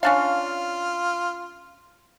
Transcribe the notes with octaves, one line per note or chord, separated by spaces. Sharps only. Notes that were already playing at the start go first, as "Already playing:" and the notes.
C#4 D4 F4 F5